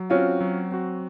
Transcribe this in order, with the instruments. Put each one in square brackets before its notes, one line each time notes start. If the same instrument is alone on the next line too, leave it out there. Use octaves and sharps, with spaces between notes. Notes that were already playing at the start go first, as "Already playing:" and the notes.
Already playing: [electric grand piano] F#3
[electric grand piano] C4 F#4 [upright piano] C#4 F4
[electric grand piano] F#3
C4 F#4